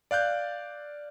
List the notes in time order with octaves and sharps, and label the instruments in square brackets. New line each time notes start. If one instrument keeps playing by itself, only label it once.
[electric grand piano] D5 F5 F#6 G6